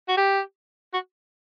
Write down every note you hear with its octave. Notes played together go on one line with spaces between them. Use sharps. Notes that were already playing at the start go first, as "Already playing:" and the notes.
F#4
G4
F#4